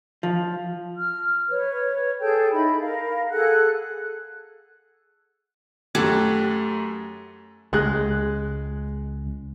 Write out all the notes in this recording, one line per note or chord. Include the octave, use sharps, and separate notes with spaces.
F3
F6
B4 C#5
G#4 A4 G5 G6
D#4 E4 B5
A#4 F5
G#4 A4 F#5 F#6
F#2 A3 G4 F#5 A5 G#6
C#2 G#3 F#6